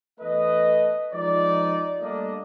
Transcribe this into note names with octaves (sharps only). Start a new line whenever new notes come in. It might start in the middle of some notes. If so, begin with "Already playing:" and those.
E2 A3 B4 D#5
F3 G#3 D#4 D5
G3 A3 A#3 D4 D5 D#5